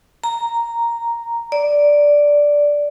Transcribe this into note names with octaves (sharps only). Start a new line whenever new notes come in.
A#5
D5